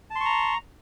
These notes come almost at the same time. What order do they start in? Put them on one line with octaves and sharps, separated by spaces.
A5 C6 C#6 A#5